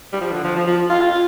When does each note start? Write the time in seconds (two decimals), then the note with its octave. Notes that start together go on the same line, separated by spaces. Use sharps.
0.13 G3
0.21 F3
0.32 D3
0.44 F3
0.56 F3
0.67 F3
0.90 F4
1.02 F4